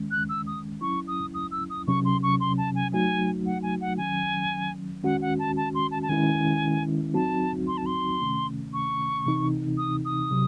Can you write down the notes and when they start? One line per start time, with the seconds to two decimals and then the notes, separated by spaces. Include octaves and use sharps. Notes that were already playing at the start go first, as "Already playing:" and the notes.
Already playing: D#3 G#3 C#4
0.11 F#6
0.29 E6
0.47 D#6
0.81 F#3 C#4 E4 C#6
1.08 D#6
1.34 D#6
1.51 E6
1.70 D#6
1.87 C3 F#3 C#4 C#6
2.05 C6
2.23 C#6
2.40 C6
2.58 A5
2.75 G#5
2.92 F#3 A3 D#4 F#4 G#5
3.46 F#5
3.62 G#5
3.81 F#5
3.97 D#3 F#3 C#4 G#5
5.04 D#3 G#3 C#4 F#4 F#5
5.22 F#5
5.39 A5
5.57 A5
5.74 C6
5.91 A5
6.02 A5
6.09 D#3 G#3 C#4 E4 G#5
7.14 F#3 C4 D#4 F#4 A5
7.67 C6
7.77 A5
7.86 C6
8.21 C3 D#3 A3 C#4
8.73 C#6
9.26 C3 E3 C4 D#4
9.78 D#6
10.05 D#6
10.31 C3 F#3